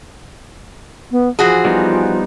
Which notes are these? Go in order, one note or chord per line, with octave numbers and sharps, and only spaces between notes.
B3
E3 F3 F#4 G#4
G3 B3 D#4